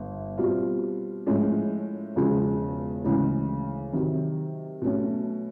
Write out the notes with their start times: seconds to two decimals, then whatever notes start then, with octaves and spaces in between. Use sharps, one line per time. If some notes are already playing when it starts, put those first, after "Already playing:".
Already playing: G1
0.38 B2 G3 C4 F4
1.26 A2 F3 G#3 C#4
2.15 E1 E2 C#3 F3 G#3
3.04 D2 C#3 E3 G#3
3.93 C3 D#3 F#3
4.82 B2 F#3 A3 C#4